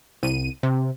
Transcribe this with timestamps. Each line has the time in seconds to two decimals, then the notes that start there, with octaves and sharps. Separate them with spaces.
0.23 C2 D#7
0.63 C3